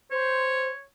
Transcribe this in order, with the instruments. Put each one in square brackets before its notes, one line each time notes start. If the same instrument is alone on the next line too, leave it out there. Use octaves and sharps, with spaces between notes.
[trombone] C5 [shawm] C#5